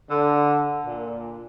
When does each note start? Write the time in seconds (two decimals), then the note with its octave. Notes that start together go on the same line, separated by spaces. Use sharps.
0.11 D3
0.85 A#2